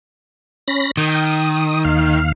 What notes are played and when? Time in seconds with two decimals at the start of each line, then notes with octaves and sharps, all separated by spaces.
0.68 C#4 B5 A#6
0.97 D#3 G5 D#6
1.25 D#6
1.85 D#2 F5